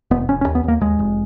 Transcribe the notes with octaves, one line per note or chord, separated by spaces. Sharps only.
F1 B3
F1 C#4
C#4
D#2
B3
D#2 A#3
D#2 G#3
F1